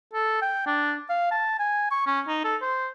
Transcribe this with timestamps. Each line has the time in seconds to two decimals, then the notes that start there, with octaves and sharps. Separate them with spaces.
0.13 A4
0.42 G5
0.66 D4
1.09 F5
1.31 A5
1.59 G#5
1.91 C#6
2.07 C#4
2.28 D#4
2.44 A4
2.62 C5